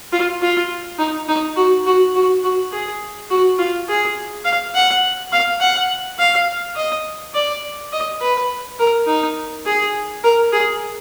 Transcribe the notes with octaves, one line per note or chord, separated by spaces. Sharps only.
F4
F4
D#4
D#4
F#4
F#4
F#4
F#4
G#4
F#4
F4
G#4
F5
F#5
F5
F#5
F5
D#5
D5
D#5
B4
A#4
D#4
G#4
A#4
G#4